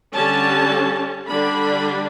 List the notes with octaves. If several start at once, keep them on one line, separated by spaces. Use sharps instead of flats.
D3 G3 C#4 A5
D3 G3 D4 B5